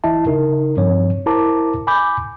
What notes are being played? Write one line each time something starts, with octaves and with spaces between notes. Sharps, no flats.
G1 E3 E4 D#5 E5 A5
C#3 D#4 A#4
G2 F3 C4 C#5
E4 A#4 C5 A5 A#5 D6
G#5 B5 D6 G6